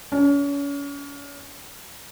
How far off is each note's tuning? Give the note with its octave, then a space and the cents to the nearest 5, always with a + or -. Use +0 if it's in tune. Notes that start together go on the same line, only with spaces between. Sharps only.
C#4 +35